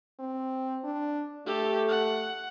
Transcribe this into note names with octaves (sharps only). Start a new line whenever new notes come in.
C4
D4
A3 G4 A4
F#5